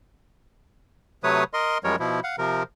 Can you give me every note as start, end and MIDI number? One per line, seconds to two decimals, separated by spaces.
1.24 1.44 48
1.24 1.44 54
1.24 1.44 57
1.24 1.44 71
1.24 1.44 73
1.24 1.44 87
1.53 1.78 70
1.53 1.78 75
1.53 1.78 84
1.84 1.96 42
1.84 1.96 53
1.84 1.96 55
1.84 1.96 56
1.84 1.96 70
1.84 1.96 73
1.99 2.20 47
1.99 2.20 53
1.99 2.20 64
2.24 2.36 77
2.24 2.36 78
2.38 2.63 48
2.38 2.63 53
2.38 2.63 70